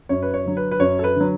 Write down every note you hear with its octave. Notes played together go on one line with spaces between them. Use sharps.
F#2 C#5
B4
C#5
D3 F#3
B4
B4
F#2 C#5
A4
B4
D3 F#3